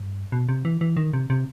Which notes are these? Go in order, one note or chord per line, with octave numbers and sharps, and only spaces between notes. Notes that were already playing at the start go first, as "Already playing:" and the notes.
Already playing: G2
B2
C3
E3
E3
D#3
C3
C3